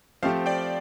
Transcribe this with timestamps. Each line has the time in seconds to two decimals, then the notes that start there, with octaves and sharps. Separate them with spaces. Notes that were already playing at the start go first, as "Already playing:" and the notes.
0.22 F3 A3 C4 G4 C5 F5
0.46 D5 G5